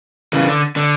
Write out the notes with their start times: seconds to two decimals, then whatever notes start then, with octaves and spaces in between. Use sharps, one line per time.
0.33 C#3 E3
0.48 D3
0.76 D3